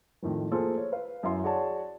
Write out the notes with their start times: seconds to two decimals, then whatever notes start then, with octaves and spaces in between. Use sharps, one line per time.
0.22 F2 A2 D#3 F3
0.51 A3 A#3 F4 G#4 A4 C5
0.77 C#5
0.92 B4 F5
1.23 F#2 E4 F5 C6
1.44 F#4 G#4 C#5 D5 A5